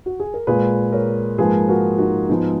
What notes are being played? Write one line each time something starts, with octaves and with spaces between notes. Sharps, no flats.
F#4
G#4
A#4
A#2 G#3 G#4 B4
A#4 C#5
G#2 F3 A#3 G#4 B4
F#4 A#4
D#4 F#4
G#2 F3 G#3 B3 D#4